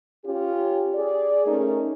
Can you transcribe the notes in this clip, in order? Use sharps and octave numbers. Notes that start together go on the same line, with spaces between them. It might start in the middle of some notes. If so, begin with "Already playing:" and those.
C#4 F4 G4
G#4 D5
A3 C#4 D#4 G#4 A#4